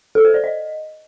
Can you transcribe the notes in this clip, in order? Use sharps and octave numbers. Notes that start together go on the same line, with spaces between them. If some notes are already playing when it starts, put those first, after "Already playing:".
A4
C5
D5
D#5